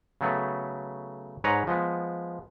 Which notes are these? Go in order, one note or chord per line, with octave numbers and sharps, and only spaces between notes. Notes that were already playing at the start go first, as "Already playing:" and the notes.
C#3 F#3 A3 B3
G#2 B4 C#5 F#5 A#5
F3 G#3 B3